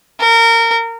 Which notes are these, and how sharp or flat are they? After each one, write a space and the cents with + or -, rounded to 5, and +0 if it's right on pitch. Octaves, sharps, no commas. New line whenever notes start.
A#4 -25